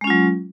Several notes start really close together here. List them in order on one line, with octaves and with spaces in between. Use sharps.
G#3 C#4 F4 F#3